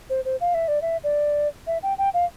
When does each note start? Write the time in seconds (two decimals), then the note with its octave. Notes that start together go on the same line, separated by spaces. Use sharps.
0.10 C5
0.25 C5
0.41 F5
0.54 E5
0.68 D5
0.82 E5
1.03 D5
1.67 E5
1.83 G5
1.98 G5
2.14 F5